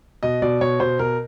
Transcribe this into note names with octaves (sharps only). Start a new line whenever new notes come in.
B2 D#5
B2 D5
B2 C#5
B2 C5
B2 A#4